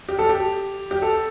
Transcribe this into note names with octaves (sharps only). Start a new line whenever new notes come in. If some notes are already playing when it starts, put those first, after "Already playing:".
G4
A4
G4
G4
A4